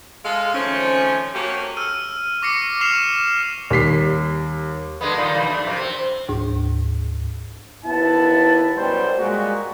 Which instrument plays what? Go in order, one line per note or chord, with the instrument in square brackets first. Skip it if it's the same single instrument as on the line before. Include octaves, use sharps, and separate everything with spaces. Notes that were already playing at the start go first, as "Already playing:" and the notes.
[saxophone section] G#3 A4 F5
D#3 F3 A3 C4 C#4
A3 A#3 C4 C#4 F#4 G4
[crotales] E6 F6 D#7
C#6 D6 A#6 C7 C#7 D#7
D6 F6 C7 E7 F7
[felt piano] D#2 G3 B6 C7
[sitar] D3 G#3 B3
A#2 D#3 G3
D#2 B2 G3
A3 D4
F#2 C3
C4
[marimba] D2 G#2
[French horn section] D#2 B3 E4 [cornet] A5
[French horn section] F#2 B2 G3 [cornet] C5
[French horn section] A#2 G3 G#3 [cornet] F#4